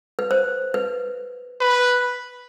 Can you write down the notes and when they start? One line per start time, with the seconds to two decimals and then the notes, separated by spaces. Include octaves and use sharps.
0.19 B4
0.31 C5
0.74 B4
1.61 B4